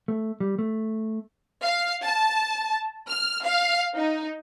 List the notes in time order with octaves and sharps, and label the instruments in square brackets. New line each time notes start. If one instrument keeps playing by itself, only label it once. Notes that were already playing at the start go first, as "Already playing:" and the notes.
[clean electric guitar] A3
G3
A3
[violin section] F5
A5
F6
F5
D#4